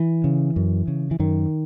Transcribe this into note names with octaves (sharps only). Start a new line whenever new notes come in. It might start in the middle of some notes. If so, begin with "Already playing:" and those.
Already playing: E3
C#3
F#2
C#3
E3
F#2 D#3